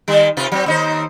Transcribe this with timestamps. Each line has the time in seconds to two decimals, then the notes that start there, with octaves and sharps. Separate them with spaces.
0.08 D#3 G3
0.37 C3 F4 B4
0.52 F#3 C4
0.66 D#2 D#4 C5